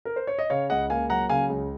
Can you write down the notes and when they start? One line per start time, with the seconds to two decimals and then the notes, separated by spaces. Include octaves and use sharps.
0.05 A#4
0.16 C5
0.27 C#5
0.39 D#5
0.50 C#3 C#5 F5
0.70 C#2 D#5 F#5
0.90 A#3 F5 G#5
1.10 F#3 F#5 A#5
1.29 C#3 F5 G#5
1.49 C#2